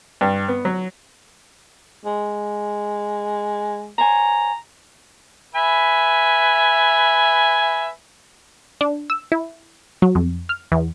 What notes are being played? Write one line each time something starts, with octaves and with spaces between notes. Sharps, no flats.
G2
B3
F#3
G#3
C5 C#5 G#5 A#5
B4 E5 G#5
D4
E6
E4
F#3
F2
F6
E2